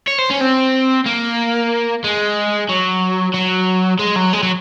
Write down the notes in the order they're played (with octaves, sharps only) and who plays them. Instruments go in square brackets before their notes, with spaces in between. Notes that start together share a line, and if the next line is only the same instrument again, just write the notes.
[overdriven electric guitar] C#5
C5
C#4
C4
A#3
G#3
F#3
F#3
G#3
F#3
G#3
F#3